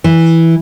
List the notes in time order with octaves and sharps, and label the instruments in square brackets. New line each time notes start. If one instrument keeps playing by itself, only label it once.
[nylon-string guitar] E3